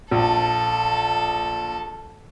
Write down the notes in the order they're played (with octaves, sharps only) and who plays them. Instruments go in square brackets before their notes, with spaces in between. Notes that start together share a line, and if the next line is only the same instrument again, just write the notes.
[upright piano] A#1 [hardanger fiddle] A4